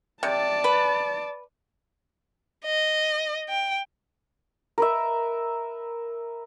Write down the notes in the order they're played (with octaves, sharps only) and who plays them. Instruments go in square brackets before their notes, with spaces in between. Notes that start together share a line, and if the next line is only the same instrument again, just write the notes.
[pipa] C3 [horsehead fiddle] D5 A5
[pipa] B4
[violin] D#5
G5
[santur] A#4 B4 E5